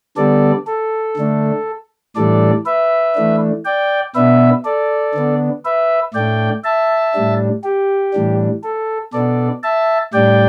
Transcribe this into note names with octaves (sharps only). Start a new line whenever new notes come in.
D3 G3 B3 A4 D5
A4
D3 A3 D4
A2 E3 G3 D4 A4 D5
B4 E5
E3 A3 D4
D5 G5
B2 B3 D4 B4 E5
A4 D5
D3 B3 D4
B4 E5
A2 A3 D4 D5 G5
E5 A5
A2 G3 D4
G4
A2 E3 G3 D4
A4
B2 B3 D4 A4 D5
E5 A5
A2 G3 D4 D5 G5